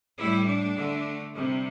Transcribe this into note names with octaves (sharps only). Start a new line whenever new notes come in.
A2 G3 E4
D4
D3 A3
C3 G3